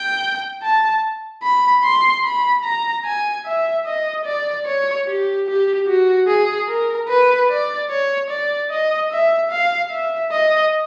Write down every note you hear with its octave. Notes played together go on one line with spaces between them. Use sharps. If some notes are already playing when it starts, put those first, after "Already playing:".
Already playing: G5
A5
B5
C6
B5
A#5
G#5
E5
D#5
D5
C#5
G4
G4
F#4
G#4
A#4
B4
D5
C#5
D5
D#5
E5
F5
E5
D#5